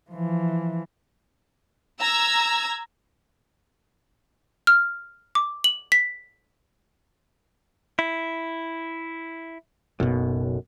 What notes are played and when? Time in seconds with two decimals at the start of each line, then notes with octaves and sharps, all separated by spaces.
0.11 E3 F3
2.00 A#5 E6 G#6
4.67 F6
5.35 D6
5.64 F#7
5.92 B6
7.99 E4
10.00 F#1 B1 F#2 B2